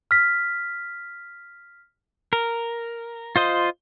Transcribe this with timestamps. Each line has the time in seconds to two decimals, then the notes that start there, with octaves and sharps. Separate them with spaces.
0.11 F6 B6
2.33 A#4
3.36 F4 C5 D#5